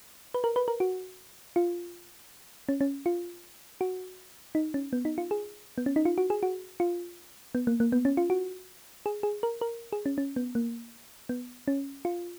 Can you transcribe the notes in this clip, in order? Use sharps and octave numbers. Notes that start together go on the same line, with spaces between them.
B4
A#4
B4
A#4
F#4
F4
C#4
C#4
F4
F#4
D#4
C#4
B3
D#4
F4
G#4
B3
C#4
D#4
F4
F#4
G#4
F#4
F4
B3
A#3
A#3
B3
C#4
F4
F#4
G#4
G#4
A#4
A#4
G#4
C#4
C#4
B3
A#3
B3
C#4
F4